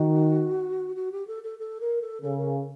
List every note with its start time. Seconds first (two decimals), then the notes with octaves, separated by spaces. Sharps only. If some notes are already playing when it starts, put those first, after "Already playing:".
Already playing: D#3 F#4
0.96 F#4
1.12 G4
1.27 A4
1.43 A4
1.59 A4
1.80 A#4
2.01 A4
2.22 C#3 A4
2.38 A#4